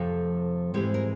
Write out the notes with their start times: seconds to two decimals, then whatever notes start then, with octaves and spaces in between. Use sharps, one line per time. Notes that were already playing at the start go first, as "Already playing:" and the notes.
Already playing: F2 C3 F3 A3
0.74 G#2 E3 G#3 C4 G4
0.94 A#4